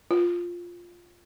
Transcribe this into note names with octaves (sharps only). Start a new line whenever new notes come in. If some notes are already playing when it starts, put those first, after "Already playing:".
F4